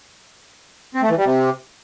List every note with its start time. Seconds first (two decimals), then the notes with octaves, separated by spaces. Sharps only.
0.95 C4
1.02 A3
1.10 E3
1.18 G3
1.25 C3